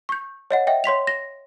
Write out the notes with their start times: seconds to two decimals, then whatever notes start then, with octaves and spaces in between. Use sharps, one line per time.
0.09 C#6 G6
0.51 C#5 D#5 F#5
0.67 D#5 E5 G5
0.84 C#5 C6 B6 F7
1.07 A#6